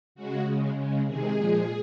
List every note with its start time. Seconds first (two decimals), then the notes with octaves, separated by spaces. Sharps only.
0.15 C#3 G#3 F#4
0.45 C#3 G#3
0.75 C#3 G#3
1.05 C3 D#3 G#3 G#4
1.36 A#2 F3 G#3